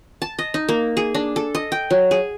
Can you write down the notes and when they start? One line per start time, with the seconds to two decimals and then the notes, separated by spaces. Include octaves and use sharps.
0.22 A5
0.39 D#5
0.54 D#4
0.69 A#3
0.97 G#4
1.15 D4
1.36 A4
1.55 D#5
1.72 G5
1.91 F#3
2.11 G#4